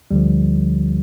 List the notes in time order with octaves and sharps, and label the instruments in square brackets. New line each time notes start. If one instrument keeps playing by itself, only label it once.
[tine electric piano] D2 D3 F3 G3